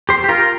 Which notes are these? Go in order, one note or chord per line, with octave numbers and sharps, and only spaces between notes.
G4 C5
G4
F4 A#4